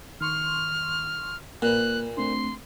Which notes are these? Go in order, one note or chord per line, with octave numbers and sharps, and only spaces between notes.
D#3 C6 C#6 F6
A#2 A#3 B4 F#6
A3 C4 D4 C6